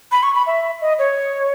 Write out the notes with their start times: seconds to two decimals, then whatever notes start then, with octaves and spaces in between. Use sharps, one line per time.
0.12 B5
0.23 C#6
0.35 B5
0.47 E5
0.81 D#5
0.99 C#5